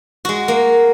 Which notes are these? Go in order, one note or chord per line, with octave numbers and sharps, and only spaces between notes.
G#3 F#4
A#3